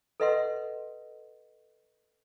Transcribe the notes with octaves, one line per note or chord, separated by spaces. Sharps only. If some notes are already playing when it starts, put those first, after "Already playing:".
A4 B4 D#5 E5 F#5 C6